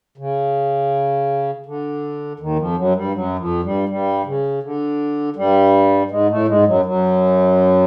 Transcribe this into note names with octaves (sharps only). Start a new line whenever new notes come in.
C#3
D3
D#2 D#3
F2 F3
F#2 F#3
G2 G3
F#2 F#3
F2 F3
G2 G3
G2 G3
C#3
D3
G2 G3
G#2 G#3
A2 A3
G#2 G#3
F#2 F#3
F#2 F#3